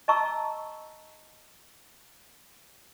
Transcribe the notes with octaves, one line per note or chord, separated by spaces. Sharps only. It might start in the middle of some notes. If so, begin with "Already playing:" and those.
D#5 A5 A#5 C#6 E6